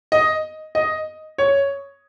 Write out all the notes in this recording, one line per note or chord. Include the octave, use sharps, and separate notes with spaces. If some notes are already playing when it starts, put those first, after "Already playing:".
D#5
D#5
C#5